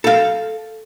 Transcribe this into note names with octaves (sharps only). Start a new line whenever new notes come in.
A4 F5